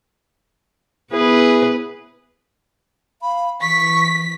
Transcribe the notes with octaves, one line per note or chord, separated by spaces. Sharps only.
B3 E4 G#4 B4
F5 B5
E3 C#6 B6